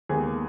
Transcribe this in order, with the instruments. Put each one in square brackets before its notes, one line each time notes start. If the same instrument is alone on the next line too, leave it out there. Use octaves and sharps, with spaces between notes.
[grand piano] D#2 D#3 G#3 B3 G#4